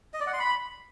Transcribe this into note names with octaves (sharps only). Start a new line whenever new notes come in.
D#5
D5
F#5
C6
B5